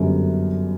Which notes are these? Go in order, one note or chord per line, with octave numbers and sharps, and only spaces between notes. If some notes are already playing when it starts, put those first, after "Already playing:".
Already playing: G1 F#2 D3 G3